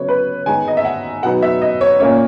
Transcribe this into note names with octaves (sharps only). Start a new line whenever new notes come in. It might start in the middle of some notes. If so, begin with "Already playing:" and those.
Already playing: C#3 F#3 B3 C#5
B4
D#3 G#3 B3 D#4 G#5
D#5
E5
F#5
B2 F#3 B3 D#4 F#5
E5
D#5
C#5
A#2 A#3 C#4 C#5